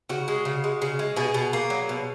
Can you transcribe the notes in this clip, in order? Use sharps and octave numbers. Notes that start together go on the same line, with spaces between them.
C#3 F#4
G#3
C#3
G#3
C#3
G#3
B2 G#4
B2
A#3
F#3
B2